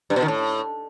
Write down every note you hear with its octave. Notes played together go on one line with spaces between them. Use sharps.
G2
B2
D#3
A2